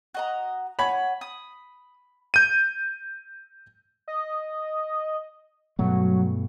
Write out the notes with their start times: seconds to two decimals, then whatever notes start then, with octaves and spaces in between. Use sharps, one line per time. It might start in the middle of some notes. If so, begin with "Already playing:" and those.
0.14 F#4 D#5 A#5
0.79 C#5 F#5 G#5 B5
1.21 D#6
2.34 G6 D#7
4.08 D#5
5.79 G2 B2 F#3 A3